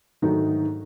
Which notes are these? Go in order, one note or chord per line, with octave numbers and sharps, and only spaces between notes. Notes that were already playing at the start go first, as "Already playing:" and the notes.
G#2 D3 D#3 F#3 A3 D#4